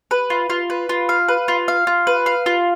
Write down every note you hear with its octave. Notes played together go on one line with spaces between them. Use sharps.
B4
F4
F4
B4
F4
F5
B4
F4
F5
F4
B4
F5
F4